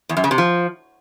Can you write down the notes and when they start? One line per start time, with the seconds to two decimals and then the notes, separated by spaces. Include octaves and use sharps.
0.09 E2
0.17 F#2
0.24 C#3
0.31 C3
0.38 F3